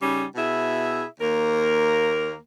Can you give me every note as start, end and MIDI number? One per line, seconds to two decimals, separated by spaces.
0.01 0.23 49
0.01 0.23 55
0.01 0.23 61
0.01 0.23 63
0.35 1.03 47
0.35 1.03 64
0.35 1.03 68
0.35 1.03 76
1.19 2.34 39
1.19 2.34 58
1.19 2.34 70